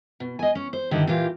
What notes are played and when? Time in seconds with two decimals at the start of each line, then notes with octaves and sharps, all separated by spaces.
0.20 B2
0.39 D#5 G#5
0.55 C#4
0.73 C5
0.91 G2 D3 D#3 E4 G4
1.07 A#2 E3 F4 G4 F5